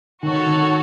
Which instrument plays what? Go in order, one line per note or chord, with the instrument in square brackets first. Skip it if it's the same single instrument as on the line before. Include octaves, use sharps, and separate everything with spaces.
[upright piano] D#3 [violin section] F#4 A4 C#5
[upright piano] D#3